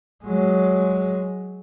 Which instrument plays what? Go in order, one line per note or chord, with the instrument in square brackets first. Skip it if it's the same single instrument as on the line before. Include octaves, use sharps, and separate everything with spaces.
[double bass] F#3 G#3